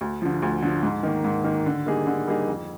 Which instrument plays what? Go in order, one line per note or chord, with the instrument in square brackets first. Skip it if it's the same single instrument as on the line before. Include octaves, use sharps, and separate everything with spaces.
[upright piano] D2
D3 F3
D2
D3 F3
G#2
D#3 A#3
G#2
D#3 A#3
D3
G3 A#3 D#4 G#4
D3
G3 A#3 D#4 G#4
F2